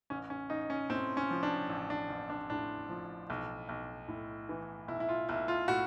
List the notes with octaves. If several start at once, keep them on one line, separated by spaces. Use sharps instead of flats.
A1 C#4
C#4
A1 D#4
C#4
A2 C4
C#4
F3
D4
A1
D4
A1
D4
A2 D4
F3
B1
B1
A2
E3
B1 E4
E4
F4
B1 E4
F4
A2 F#4